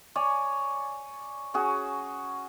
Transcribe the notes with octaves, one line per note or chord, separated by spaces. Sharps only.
C#5 D5 G#5
C#4 F#4 G#4